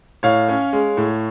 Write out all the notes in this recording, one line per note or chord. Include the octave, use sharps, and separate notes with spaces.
A2 C#5 F5
C#4
G#3
A2